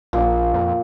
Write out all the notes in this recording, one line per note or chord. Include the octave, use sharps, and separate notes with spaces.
A#1 A#2
F2